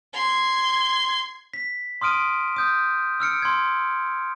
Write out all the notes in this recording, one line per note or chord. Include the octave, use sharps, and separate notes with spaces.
C6 G#6
B6
C6 D#6 F6 D7 D#7
D#6 G6
E6 F6 C#7 D7
C6 G#6